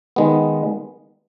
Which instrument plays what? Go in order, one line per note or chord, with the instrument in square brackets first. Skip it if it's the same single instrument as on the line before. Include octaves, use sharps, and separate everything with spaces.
[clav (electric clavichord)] D#3 G#3 B3